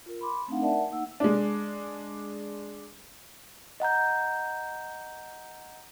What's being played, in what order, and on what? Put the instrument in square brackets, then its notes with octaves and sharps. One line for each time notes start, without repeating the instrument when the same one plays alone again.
[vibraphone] F4 A#4
B5 C6 D6
A3 C4 D4 D#4 F5 F#5
A#4 D5 E5 F#5 A5
A#3 D#4 F#5 E6
[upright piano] G#3 D4
[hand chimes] D#5 F#5 A#5 G6